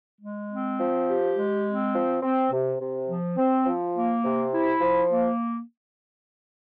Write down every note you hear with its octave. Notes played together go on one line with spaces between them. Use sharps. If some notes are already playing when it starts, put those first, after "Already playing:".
G#3
C4
F3
G4
G#3
C4
F3
C4
C3
C3
F3
C4
F3
A#3
C3
E4
F3
A#3